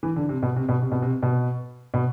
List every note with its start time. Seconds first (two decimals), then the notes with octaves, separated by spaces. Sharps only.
0.03 E3
0.16 D3
0.29 C3
0.43 B2
0.56 C3
0.69 B2
0.82 C3
0.92 B2
1.02 C3
1.23 B2
1.94 B2